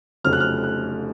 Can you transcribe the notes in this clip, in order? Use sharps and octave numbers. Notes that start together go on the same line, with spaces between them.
F1 F2 C#3 F#3 F6
F#6
F6
F#6